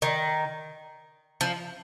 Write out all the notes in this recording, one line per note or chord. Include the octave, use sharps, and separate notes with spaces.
D#3
F3